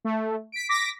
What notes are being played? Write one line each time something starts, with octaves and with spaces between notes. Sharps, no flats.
A3
B6 D7
D6 A#6 B6